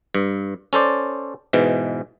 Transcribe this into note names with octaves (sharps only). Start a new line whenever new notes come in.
G2
C#4 A4 C5 D5
G#2 B2 E3